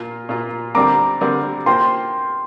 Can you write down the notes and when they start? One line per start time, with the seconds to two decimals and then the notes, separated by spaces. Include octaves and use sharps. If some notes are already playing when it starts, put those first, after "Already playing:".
Already playing: A#2 A#3 F4
0.29 A#2 A#3 F4
0.75 D3 G3 C4 A#4 A#5 D6
1.21 D3 G3 C4 A#4
1.66 A#3 F4 C5 G5 C6